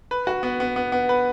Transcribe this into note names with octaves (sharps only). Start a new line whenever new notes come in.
B4
F#4
B3
B3
B3
B3
B4